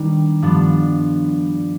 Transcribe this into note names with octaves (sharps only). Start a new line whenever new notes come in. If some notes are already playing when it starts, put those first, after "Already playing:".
Already playing: D#3 G3 B3 D4
G2 F3 B3 D4